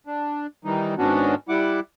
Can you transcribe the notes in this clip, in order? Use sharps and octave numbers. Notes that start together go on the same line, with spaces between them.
D4
D#3 E3 G3 D#4
G#2 D#3 B3 C#4 D4 F#4
G3 E4 F#5 D6